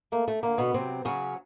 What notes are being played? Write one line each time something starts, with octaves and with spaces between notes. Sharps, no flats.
A3 A#3
A3
D3 A#3
B2 B3
C3 F#3 C4
C#3 F#3 C#4